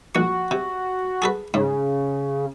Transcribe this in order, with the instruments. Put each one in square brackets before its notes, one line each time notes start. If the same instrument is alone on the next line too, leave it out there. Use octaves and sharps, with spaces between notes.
[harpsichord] A#1 C#6 [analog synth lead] F#4
[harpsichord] C3
G#4 A4 B4
[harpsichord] G#2 [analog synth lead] C#3